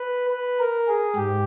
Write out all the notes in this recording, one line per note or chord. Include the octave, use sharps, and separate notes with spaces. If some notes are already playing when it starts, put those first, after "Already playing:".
Already playing: B4
B4
A#4
G#4
G#2 G4